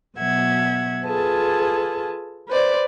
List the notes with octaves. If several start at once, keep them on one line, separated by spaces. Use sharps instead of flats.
B2 F#3 E5 F#5 G#6
F4 G#4 A4 B4 A5
B4 C5 D5